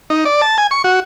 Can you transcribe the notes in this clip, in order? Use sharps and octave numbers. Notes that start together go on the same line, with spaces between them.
D#4
D5
A5
G#5
C#6
F#4